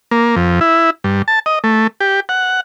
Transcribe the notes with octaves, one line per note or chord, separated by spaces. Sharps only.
A#3
F2
E4
G2
A5
D#5
A3
G4
F#5